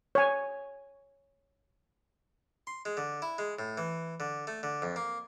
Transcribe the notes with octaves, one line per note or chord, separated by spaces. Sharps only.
C#5 G#5
C6
G#3
D3
E4
G#3
A2
E3
D3
A3
D3
F2
A#3